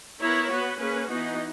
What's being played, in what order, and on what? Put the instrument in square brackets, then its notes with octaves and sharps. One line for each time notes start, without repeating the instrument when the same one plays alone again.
[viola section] B3 E4 A#4 C#5
B3 F#4 B4
A#3 C#4 G#4 B4
E3 B3 D#4 F#4